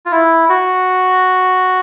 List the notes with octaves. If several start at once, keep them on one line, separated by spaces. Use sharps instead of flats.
F4
E4
F#4